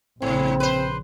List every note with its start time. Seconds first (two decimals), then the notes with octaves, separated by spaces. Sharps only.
0.22 A#1 G#2 C#3 C4
0.60 B4 C5